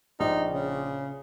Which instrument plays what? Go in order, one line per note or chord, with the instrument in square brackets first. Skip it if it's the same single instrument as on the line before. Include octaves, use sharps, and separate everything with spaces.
[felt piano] A#1 [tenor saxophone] D#4
[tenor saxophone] C#3